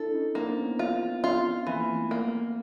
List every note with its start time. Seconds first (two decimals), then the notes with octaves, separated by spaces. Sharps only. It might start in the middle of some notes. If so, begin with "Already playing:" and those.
Already playing: D4 E4 A4
0.14 C#4 D#4
0.35 A#3 C4 D4
0.58 B3 C#4
0.79 F4
1.24 F4
1.67 E3 A#3 C4
1.95 A3 B3
2.11 A#3
2.25 A3 B3